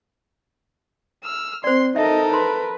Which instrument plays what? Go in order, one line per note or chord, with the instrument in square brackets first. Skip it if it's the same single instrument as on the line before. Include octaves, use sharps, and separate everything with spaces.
[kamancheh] E6 F6
[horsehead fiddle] C4 [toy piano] C5 D5 [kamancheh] C6
[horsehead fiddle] D#4 D#5 [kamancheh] A4 A#4 [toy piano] E5
[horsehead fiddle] B4 [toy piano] C6